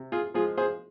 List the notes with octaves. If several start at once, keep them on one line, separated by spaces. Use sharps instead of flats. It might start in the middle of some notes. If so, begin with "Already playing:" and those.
Already playing: C3
F4 G#4
F3 G#3 F4 G#4
G#4 C5